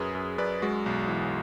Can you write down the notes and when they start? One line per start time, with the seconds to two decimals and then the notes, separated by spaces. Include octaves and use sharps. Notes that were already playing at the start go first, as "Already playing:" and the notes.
Already playing: F#2 G#4 B4
0.15 F#2
0.38 F#2 B4 D5
0.62 G#3 F#4
0.86 B1
1.08 E3